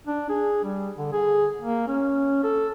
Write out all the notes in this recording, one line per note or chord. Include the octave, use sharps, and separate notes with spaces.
D4
G#4
G3
D3
G#4
A#3
C#4
A4